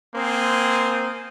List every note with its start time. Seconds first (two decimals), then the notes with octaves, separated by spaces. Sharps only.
0.16 A#3 C4 C5 G#5 C6 D#6